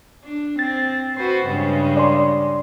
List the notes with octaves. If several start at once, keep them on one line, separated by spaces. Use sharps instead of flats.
D4
C4 A6
F#4 B4 C5
G2 C#3 G#3
D5 C6